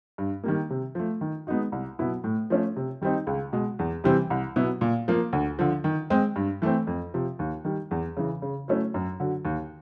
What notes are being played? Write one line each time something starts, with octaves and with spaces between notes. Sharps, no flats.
G2
D#3 G3 A#3
C3
F3 A3
D#3
G#3 B3 D#4 F#4
C2
B2 F#3 B3 E4
A2
F3 A3 C#4
C3
D#3 G3 C4 D#4
C#2
B2 G#3
E2
C3 E3 G3 C4
C2
B2 F#3 B3 E4
A#2
F3 A#3
D2
D3 F3
D#3
G#3 C4
G2
E3 A3 C4
F2
C3 F3
D#2
D#3 G3
E2
C#3 E3
C#3
F#3 A3 C#4 E4
F#2
D3 F#3
D#2